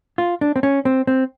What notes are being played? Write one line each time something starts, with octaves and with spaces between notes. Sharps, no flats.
F4
D4
C4
C#4
C4
C4